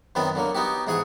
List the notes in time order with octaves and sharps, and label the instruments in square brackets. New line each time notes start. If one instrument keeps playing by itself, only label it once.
[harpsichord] F#2 D#3 B3 C4 B4 A5
D3 F#3 A#3
B3 D#4 F#4 G4
G#2 E3 G#4 F#5 G#5 C#6